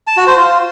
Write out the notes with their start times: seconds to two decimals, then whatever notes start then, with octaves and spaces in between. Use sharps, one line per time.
0.07 A5
0.17 F#4
0.27 C5
0.37 F4